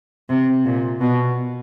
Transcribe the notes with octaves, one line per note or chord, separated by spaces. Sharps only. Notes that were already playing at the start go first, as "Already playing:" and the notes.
C3
A#2
B2